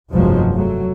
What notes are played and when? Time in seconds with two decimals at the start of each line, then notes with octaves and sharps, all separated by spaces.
0.11 F1 B1 G2 F3 F#3 G#3
0.55 F#3 A3